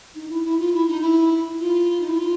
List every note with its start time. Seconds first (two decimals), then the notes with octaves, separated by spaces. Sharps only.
0.14 D#4
0.29 E4
0.44 E4
0.59 F4
0.73 E4
0.87 D#4
1.01 E4
1.59 F4
2.00 D#4
2.08 E4
2.16 F4